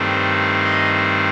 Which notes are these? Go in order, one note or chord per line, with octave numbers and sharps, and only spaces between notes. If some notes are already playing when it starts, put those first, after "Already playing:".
Already playing: G2 D#3 A3 C4
D#5